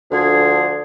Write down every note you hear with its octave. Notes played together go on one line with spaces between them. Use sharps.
D2 D3 F3 G#4